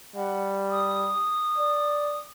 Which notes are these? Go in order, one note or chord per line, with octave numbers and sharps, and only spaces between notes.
G3 F#5
D#6
D5